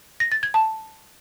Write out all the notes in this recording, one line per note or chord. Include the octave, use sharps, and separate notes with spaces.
A#6
A6
G#6
A5